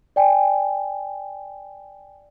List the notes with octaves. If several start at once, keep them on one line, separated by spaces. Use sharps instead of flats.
D5 G5 G#5